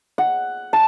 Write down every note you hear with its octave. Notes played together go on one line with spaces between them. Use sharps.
F#5
A5